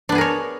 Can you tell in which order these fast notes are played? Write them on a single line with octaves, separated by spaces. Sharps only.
D4 B3 G#4 A#4 C#5